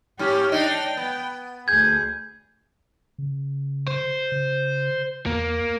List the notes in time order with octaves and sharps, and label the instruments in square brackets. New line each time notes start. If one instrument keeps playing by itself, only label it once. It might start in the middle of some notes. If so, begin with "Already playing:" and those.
[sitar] G#2 C#4 [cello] G4
[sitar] D4 D#4 [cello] G5
[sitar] B3
[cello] D2 G#4 [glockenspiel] G6 G#6
[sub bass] C#3
[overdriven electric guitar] C5
[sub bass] C#3
[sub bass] E2 [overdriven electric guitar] A#3